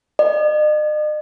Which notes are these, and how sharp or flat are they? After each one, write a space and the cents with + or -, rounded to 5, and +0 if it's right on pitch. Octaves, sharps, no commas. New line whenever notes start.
D#5 -45